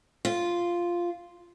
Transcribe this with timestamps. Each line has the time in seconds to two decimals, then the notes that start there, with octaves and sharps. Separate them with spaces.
0.25 F4